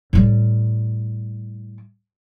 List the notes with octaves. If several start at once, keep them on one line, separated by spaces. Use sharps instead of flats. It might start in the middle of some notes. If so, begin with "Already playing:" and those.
A2 G3